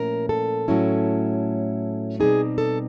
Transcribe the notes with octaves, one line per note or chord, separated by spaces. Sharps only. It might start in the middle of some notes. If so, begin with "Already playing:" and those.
Already playing: A#2 F3 A3 C#4 E4 A#4
A4
A2 F#3 A3 C#4 E4
B2 G3 C4 D#4 G#4
A4